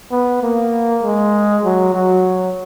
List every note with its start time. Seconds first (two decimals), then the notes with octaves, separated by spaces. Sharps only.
0.11 B3
0.43 A#3
1.03 G#3
1.64 F#3
1.94 F#3